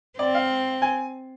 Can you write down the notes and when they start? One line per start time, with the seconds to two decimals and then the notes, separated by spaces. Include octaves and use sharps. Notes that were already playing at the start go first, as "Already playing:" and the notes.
0.19 C4 D5
0.35 F5
0.82 G#5